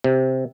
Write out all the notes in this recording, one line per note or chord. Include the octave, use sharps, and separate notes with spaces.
C3